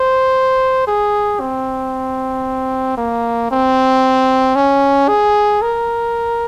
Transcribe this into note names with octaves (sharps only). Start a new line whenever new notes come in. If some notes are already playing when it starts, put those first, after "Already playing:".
Already playing: C5
G#4
C4
A#3
C4
C#4
G#4
A#4